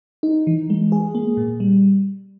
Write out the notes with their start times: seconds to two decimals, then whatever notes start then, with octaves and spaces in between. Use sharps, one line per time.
0.23 D#4
0.47 E3
0.70 G#3
0.92 G#4
1.15 A#3
1.37 A#2
1.60 G3